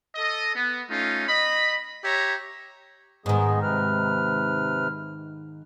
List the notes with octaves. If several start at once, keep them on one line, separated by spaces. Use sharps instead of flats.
A4 D#5
B3
A3 C#4 D#4 F4
D#5 B5
G4 C#5 E5 A#5
G#2 D#3 G#3 B3 G#4
C3 B4 F6